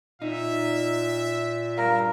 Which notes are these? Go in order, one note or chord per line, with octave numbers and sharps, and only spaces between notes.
A#2 D#4 E5
G2 A#4 F5